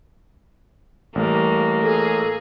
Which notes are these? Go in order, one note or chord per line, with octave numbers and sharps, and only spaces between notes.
A1 G3 A3 A#3 F5
G#4 A4